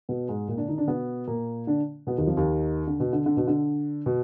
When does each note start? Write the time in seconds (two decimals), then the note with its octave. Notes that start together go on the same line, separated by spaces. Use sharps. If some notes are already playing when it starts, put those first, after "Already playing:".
0.09 B2 B3
0.29 G#2 G#3
0.48 A#2 A#3
0.58 D3 D4
0.69 D#3 D#4
0.78 D3 D4
0.87 B2 B3
1.27 A#2 A#3
1.67 D3 D4
2.07 B2 B3
2.18 D#2 D#3
2.27 F2 F3
2.37 D#2 D#3
2.87 D3
3.00 B2
3.13 D3
3.26 D3
3.37 B2
3.47 D3
4.06 B2